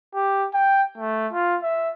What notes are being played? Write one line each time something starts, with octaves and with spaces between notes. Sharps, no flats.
G4
G5
A3
F4
E5